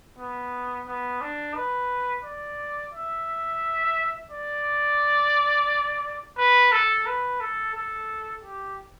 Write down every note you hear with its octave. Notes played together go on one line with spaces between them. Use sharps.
B3
B3
D4
B4
D5
E5
D5
B4
A4
B4
A4
A4
G4